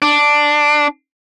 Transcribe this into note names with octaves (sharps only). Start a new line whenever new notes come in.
D4